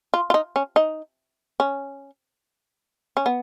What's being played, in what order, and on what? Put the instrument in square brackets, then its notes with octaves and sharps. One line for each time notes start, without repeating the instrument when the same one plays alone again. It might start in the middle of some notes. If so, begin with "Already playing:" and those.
[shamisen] F4
F4
D#4
C#4
D#4
C#4
C#4
B3